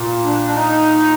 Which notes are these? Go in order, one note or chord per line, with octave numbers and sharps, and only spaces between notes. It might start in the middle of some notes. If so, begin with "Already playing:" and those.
Already playing: A#2
D4
D4
D#4